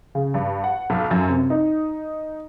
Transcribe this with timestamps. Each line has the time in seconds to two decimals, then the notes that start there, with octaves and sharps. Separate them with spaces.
0.15 C#3
0.34 G2
0.64 F#5
0.90 B1
1.11 F#2
1.30 C3
1.50 D#4